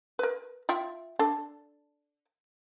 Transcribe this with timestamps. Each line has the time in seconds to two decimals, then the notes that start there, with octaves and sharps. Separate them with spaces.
0.19 A#4 B4
0.69 F4 E5 G5
1.19 D4 A4